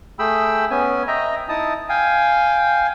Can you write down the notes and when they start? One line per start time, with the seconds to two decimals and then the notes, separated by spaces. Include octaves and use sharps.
0.19 A3 G#4 G5 B5 E6
0.70 B3 C#4 G#5
1.08 D#5 E5 G5 A#5
1.49 D#4 E4 A5 D#6
1.89 F5 G5 G#5